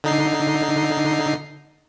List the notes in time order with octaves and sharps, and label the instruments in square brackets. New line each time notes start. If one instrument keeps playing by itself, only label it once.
[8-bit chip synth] D3 D#4 C7